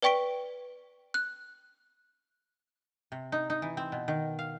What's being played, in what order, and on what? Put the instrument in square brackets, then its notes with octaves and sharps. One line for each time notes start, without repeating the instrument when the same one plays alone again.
[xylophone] B4 D5 G5 C#6 B6 D7
F#6
[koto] C3
D#4
D#4
E3
C4
B2
D#3
F5